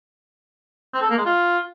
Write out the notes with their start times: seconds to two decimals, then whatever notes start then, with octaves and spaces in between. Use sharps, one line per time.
0.94 C4
1.02 A4
1.10 A#3
1.18 G#3
1.26 F4